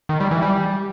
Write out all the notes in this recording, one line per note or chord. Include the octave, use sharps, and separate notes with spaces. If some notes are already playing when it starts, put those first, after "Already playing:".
D#3
G3
E3
G3